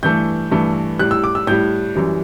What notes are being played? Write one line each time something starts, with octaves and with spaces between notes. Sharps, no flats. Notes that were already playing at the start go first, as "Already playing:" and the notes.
G2 E3 A3 G6
G2 E3 A3
A2 G3 F#6
E6
D6
E6
A2 G3 G6
F#2 E3 G3